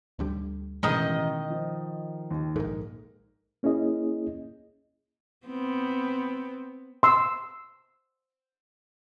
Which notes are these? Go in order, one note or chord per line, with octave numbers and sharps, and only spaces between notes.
D2 D3 G3
A1 B2 D3 D#3 G#3 D#5 D#6
F3
D#2
A#1 G#2 A#4
A#3 C#4 E4 G#4 D#5
B3 C4
C6 E6